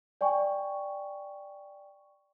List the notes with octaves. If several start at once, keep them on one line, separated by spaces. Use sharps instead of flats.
D5 G5 G#5 C#6